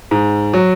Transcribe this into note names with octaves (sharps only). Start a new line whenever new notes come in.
G#2
F#3